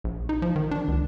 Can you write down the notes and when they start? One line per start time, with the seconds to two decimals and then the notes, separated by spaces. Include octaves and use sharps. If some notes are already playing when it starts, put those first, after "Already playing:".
0.04 A#1
0.29 D#4
0.42 F3
0.56 D#3
0.71 D4
0.88 C#2